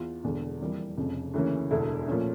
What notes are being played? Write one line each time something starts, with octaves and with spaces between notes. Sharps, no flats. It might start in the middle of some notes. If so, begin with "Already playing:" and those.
Already playing: E2 F4
E1 E2 D3
F2 E3 G3 A#3
F1 F2 C#3
D2 C#3 E3 A#3 C#4
E1 D2 D3 A3 E4
A#2 F3 A3 C#4